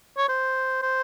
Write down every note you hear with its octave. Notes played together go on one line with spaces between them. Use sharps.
C#5
C5
C5